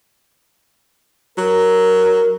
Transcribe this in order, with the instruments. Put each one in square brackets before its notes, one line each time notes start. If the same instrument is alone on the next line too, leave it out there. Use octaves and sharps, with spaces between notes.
[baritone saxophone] F#3 [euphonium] A#4